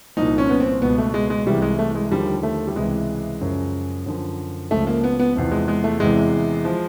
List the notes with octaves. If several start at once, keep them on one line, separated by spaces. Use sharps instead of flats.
C2 A#2 F3 D#4
C#4
B3
C4
C#2 B2 B3
A3
G#3
G#3
C2 C3 E3 G3
G#3
A3
G#3
D#2 D3 F3 G3
A3
G3
C#2 C3 E3 G#3
F#2 C#3 F3
F#2 D3 F3
C#2 C#3 F3 A3
A#3
B3
B3
E2 C3 F3
G#3
G#3
A3
E2 C3 E3 G#3
F3